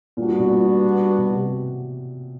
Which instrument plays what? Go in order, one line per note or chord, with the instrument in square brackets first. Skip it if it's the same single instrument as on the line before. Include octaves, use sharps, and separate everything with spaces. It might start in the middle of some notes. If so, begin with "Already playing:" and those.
[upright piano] A#2 [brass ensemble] G3 B3 D4 F#4
[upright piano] A#2
B2
A#2
B2
C3